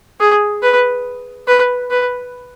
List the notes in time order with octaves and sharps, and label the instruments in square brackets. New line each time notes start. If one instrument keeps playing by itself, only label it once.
[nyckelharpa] G#4
B4
B4
B4